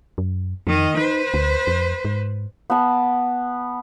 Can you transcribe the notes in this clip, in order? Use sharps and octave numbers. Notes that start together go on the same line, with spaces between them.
F#2
F2 D#3 D#5
D#4 B4 C5
D2
F2
G#2
B3 A5